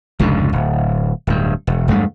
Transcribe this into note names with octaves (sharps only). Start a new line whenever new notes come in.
F1 C#2 G#2 D3
D1
D1 G2
E1
E1 G2 G#3 A3